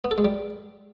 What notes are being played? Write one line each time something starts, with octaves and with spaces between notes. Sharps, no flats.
B3
A4
G#3
G3